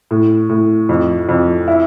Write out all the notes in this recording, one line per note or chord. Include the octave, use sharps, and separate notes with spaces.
A2
A2
F2
F2
E4